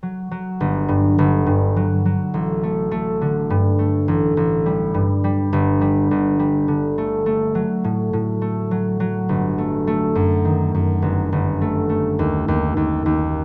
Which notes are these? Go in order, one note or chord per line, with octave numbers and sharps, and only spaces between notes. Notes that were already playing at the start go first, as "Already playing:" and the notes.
F#3
F#3
G1
G2
G1
G2
F#3
F#3
A1
A3
A3
D3
G2
A3
A1
A1
G3
G2
G3
G1
G3
G1
G3
D3
A3
A3
F#3
A2
A2
A3
F#3
F#3
G1
A3
A3
F#2
D#3
F#2
G1
G1
A3
A3
D#2
D#2
D#2
D#2